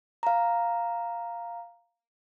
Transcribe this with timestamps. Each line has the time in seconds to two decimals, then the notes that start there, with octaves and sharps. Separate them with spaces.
0.23 F5 A#5